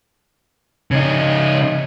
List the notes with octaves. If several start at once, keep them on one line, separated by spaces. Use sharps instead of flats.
C#3 D#4